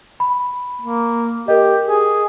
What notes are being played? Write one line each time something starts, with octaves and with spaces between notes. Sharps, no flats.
B5
A#3
G4 A#4 D#5
G#4